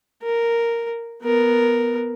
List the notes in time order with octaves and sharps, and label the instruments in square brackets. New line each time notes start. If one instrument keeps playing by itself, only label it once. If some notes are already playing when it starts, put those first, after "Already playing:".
[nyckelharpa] A#4
B3 A#4